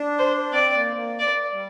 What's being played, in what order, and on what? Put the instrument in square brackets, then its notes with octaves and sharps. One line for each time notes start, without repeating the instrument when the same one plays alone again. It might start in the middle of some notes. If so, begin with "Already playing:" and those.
Already playing: [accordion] D4
[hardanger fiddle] C5
[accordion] C4 [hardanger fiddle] D5
[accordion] A#3
A#3
[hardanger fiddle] D5
[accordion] G3